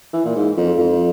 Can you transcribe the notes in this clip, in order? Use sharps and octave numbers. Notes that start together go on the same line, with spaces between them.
E3
A#2
G#2
F2
F2